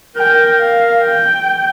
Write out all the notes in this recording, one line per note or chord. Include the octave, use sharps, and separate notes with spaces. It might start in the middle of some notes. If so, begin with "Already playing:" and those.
A#4 G5
F5
G5